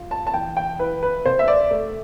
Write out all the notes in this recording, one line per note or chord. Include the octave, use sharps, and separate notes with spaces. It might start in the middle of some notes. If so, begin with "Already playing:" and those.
Already playing: F4
A5
A5
E3 G5
G5
E4 B4
B4
C3 C5
E5
D5
A3